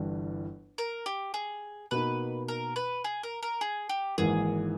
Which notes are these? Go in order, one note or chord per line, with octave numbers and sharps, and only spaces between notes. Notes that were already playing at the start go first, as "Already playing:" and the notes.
Already playing: G1 G2 E3 G3
A#4
G4
G#4
B2 A#3 D#4 B4
A#4
B4
G#4
A#4
A#4
G#4
G4
G#1 G#2 E3 A#3 G#4